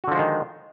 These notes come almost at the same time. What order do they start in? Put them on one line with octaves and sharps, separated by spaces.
F#4 D3 F3 G#3 D#3